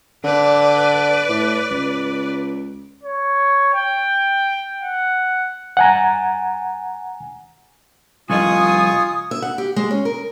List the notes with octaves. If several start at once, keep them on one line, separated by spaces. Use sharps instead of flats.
D3 B4 D5
A2
C#2
C#5
G5
F#5
F#5 G#5 A#5
C2 F2 F4 D#5 G#5 C#6 D#6
E5
F#5
G4
G#3
C#4
A#4